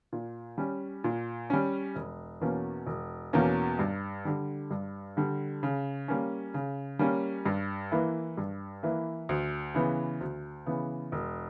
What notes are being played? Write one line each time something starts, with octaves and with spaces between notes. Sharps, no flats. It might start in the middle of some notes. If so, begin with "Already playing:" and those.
A#2
G3 C#4
A#2
G3 C#4
E1
E2 B2 A#3 C#4
E1
E2 B2 A#3 C#4
G2
D3 G3
G2
D3 G3
C#3
G3 A#3 C#4
C#3
G3 A#3 C#4
G2
E3 A#3 E4 B4
G2
E3 A#3 E4 B4
D2
C#3 E3 B3
D2
C#3 E3 B3
E1